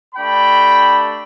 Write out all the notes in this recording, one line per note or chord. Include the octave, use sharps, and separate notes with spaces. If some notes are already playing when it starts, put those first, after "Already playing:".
A3 D4 G4 G5 B5